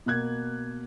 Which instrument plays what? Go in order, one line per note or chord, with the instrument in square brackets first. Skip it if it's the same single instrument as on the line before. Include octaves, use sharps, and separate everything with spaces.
[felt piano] B2 A#3 F#6 G#6